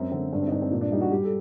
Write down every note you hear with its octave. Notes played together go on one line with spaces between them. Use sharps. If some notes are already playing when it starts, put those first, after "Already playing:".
Already playing: F#2 C4
D3 C4
G2 D4
C4
D#4
G2 D4
C4
A#2
D4
G3 D#4
F#4
G3 G4
A4